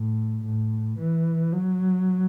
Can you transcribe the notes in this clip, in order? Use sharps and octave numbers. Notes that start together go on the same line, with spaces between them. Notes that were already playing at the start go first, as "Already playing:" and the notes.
Already playing: A2
A2
E3
F#3